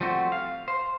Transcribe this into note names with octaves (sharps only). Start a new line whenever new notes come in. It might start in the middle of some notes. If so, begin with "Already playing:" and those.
F3 G3 A3 C4 F#4
F5
C5